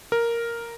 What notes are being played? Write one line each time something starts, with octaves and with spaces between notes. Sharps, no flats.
A#4